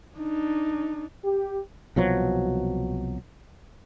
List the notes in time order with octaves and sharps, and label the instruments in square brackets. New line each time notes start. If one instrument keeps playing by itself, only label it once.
[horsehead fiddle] D4 D#4
[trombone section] G4
[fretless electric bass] C2 B2 F3 F#3